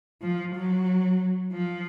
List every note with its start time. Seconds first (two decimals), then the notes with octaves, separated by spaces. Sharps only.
0.22 F3
0.55 F#3
1.52 F3